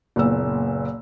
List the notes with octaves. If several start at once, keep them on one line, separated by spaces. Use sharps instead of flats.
F#1 A#2 B3 E6